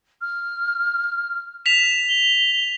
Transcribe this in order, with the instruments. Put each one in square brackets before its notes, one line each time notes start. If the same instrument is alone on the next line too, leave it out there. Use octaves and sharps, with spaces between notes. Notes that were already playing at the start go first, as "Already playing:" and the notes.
[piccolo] F6
[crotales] B6 F7 [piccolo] E7
[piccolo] G7